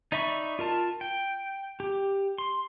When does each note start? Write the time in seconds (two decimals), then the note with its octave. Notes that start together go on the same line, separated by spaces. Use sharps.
0.12 D#4 D5 E5 B5 C#6
0.59 F4 A#4 A5
1.01 G5
1.80 G4
2.38 C6